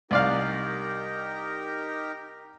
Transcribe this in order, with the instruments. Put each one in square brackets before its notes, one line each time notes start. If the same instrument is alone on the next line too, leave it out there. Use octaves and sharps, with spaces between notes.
[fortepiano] C2 D5 F5 [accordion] D#4 G4 A#4